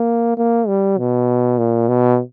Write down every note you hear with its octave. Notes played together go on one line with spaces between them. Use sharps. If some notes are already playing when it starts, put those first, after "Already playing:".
Already playing: A#3
A#3
G3
B2
A#2
B2